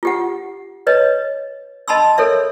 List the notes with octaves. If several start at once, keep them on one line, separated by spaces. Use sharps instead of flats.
F4 G4 F#5
B4 C#5 D#5
D#5 A5 B5 C6 E6
A4 A#4 C#5 E5